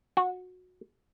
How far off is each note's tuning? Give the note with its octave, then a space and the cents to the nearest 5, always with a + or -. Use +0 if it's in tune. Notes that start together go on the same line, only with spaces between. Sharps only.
F#4 -20